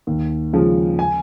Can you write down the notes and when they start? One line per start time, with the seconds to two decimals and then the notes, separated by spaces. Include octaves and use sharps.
0.07 D#2
0.53 C#3 F3 G#3
0.99 G#5